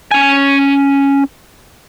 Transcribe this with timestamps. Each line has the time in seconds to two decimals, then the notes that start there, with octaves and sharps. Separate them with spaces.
0.11 C#4 G#5